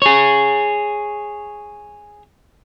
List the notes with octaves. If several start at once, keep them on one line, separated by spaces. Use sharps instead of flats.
G#4 C#5